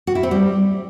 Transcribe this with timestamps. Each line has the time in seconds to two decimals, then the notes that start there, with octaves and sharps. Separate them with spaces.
0.07 F#4
0.15 E4
0.23 C4
0.31 G3